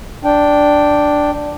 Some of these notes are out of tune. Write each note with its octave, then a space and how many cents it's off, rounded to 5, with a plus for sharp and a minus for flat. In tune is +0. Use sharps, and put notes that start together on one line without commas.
D4 +0 G5 +0